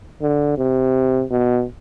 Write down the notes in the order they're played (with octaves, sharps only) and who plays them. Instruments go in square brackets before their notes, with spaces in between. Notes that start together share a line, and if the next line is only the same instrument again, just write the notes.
[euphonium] D3
C3
B2